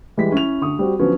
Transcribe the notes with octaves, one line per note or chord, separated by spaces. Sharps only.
E3 G3 G#3 B6
C#4 E4 F7
D2 C#6 D#6
G3 C4 F#4
D3 F3 F#3 B3 C#4